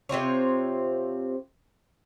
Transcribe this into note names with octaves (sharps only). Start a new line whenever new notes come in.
C3 C4 F4 C#5